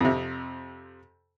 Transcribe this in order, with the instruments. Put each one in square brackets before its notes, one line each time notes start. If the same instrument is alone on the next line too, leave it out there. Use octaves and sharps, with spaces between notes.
[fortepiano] F2 C3